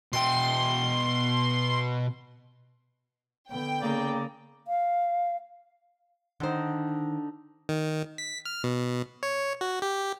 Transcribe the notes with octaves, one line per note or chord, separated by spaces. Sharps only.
B2 G5 C6
D3 B3 G5
C#3 A#3 D5 A#5
F5
D3 D#3 D#4 C5
D#3
B6
F6
B2
C#5
F#4
G4